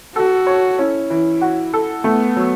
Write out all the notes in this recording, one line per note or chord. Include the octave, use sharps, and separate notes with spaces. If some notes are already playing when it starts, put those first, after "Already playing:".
F#4 A4
C#5
C#4 E4
E3
F#4
A4
A3 B3
F#3